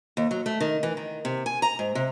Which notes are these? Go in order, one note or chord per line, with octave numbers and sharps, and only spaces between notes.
D#2
F#3
A3
D#3
E3
D#3
C3
G#5
A#5
G#2
C3